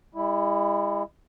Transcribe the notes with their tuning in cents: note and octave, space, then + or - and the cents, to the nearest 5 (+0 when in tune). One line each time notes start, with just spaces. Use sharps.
G#3 -45 E4 +0